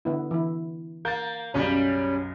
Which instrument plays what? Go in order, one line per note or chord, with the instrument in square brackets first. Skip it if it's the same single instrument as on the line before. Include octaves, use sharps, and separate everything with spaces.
[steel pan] D3 B3 E4
E3 E4
[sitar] A#3 [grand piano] G6 A6
[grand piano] B1 F#2 C#3 [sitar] G3 C#4